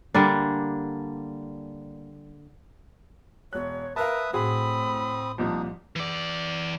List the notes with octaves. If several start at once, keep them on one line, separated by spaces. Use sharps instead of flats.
D3 G3 A#3 D4
E1 C#5 F#6
A#4 B4 E5 F5 A5 D#6
A2 C4 F#4 G#4 B5 D#6
C2 A#2 F3 D#4
E3 D5